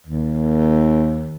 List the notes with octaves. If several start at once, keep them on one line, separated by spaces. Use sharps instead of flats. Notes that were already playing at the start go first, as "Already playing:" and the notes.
D#2